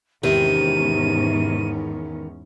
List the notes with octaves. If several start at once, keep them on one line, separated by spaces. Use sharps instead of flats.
E2 G#2 C3 D#3 C#4 D#7